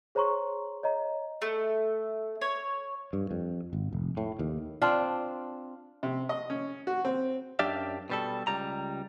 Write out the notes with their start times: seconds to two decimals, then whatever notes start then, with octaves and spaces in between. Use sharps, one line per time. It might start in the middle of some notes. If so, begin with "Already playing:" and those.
0.15 G#4 C5 C#5 A#5 C6 C#6
0.83 C#5 D#5 A#5
1.42 A3
2.41 C#5
3.13 G2
3.31 F2
3.73 G#1
3.93 F1
4.17 A2
4.39 D#2
4.82 C4 D4 F4
6.03 C3
6.29 D#5
6.50 C#4
6.87 F#4
7.05 C4
7.59 F#2 D4 G4 D5 E5 F5
8.10 B2 G3 A4
8.47 C#2 G3 A#5